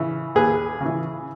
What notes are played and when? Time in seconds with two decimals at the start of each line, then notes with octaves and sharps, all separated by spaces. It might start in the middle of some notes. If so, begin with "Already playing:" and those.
Already playing: C#3 E3
0.35 D#2 G#4 B4
0.81 C#3 E3